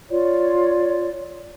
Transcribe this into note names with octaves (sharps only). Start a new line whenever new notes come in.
F4 C#5 D5